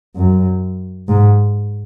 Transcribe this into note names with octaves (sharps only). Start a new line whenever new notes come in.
F#2
G#2